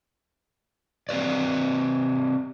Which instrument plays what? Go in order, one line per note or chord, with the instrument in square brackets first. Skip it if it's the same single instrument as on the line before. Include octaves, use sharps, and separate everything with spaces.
[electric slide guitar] C4 G4 B4 D5